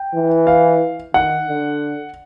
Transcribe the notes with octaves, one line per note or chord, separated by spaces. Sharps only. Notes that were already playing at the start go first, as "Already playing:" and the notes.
Already playing: G5
E3
F5
D#3 F#5
D3